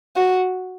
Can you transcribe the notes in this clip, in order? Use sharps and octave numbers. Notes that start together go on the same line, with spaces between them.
F#4